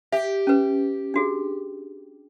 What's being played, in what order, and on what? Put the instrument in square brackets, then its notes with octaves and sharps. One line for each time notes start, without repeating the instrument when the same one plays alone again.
[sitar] G4 [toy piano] E5
[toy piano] C#4 B4
D4 F#4 G#4